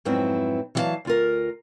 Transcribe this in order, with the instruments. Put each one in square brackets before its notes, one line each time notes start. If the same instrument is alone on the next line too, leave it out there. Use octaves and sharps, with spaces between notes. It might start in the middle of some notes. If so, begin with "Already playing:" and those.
[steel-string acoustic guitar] F2 G#2 F#3 B3 C4 E4
E3 F#3 F#4 G4 F5 A5
D2 F4 A#4